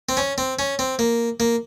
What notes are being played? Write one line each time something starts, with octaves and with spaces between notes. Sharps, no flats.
C4
C#4
C4
C#4
C4
A#3
A#3